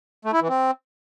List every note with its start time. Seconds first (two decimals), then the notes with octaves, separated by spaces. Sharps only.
0.25 A3
0.33 E4
0.41 E3
0.49 C4